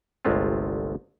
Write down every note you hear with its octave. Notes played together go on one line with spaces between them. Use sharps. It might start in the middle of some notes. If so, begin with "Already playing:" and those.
G1 C2 C3 G#3 A3 F4